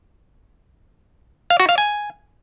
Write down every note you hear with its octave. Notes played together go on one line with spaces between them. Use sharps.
F5
F#4
F5
G#5